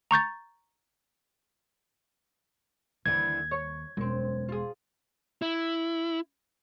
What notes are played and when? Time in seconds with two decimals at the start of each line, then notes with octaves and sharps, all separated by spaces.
0.11 A#5 C#6 G6 A6
3.06 D#2 D3 E3 G#6
3.51 C#5
3.97 E1 F#2 C4
4.49 F4 G#4
5.42 E4